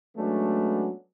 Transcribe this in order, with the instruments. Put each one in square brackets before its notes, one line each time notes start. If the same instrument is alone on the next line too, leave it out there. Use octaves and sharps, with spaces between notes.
[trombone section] F#3 G#3 A3 B3 C#4 D4